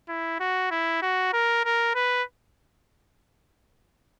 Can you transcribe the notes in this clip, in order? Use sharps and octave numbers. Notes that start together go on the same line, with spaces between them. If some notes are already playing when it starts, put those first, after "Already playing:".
E4
F#4
E4
F#4
A#4
A#4
B4